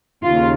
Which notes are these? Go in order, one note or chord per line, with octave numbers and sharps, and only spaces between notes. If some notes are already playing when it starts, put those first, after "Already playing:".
D#2 C#3 F4